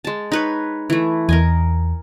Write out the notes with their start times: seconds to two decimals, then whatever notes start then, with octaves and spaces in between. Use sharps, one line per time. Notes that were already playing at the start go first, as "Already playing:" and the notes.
0.05 G#3 A5
0.32 D#4 B4 C#5
0.90 E3 A3
1.29 E2 A#4 D#5 G#5